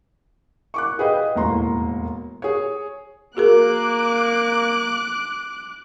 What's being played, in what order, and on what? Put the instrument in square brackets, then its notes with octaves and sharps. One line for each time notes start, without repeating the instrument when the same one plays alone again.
[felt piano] C#6 D6 F#6
G#4 B4 D#5 F5 G5
E1 D#2 A2 A#5 C6
G#4 C#5
[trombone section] A#3 [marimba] F#4 G#4 A#4 [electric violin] D6 F#6